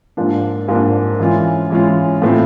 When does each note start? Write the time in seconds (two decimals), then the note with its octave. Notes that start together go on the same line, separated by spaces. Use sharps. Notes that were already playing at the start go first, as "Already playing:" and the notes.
0.17 G#2 F3 A#3 D4
0.68 G#2 F3 A#3 D4
1.20 E3 G#3 C#4 F4
1.70 E3 G#3 C#4 F4
2.22 A2 F3 A3 C4